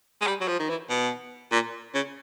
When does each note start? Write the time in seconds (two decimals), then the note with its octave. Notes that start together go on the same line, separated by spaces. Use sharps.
0.21 G#3
0.27 G3
0.41 F#3
0.48 F3
0.59 D#3
0.69 E3
0.90 B2
1.52 A#2
1.94 C#3